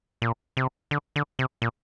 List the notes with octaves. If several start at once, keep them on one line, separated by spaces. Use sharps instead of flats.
A#2
C3
D3
D3
C3
A#2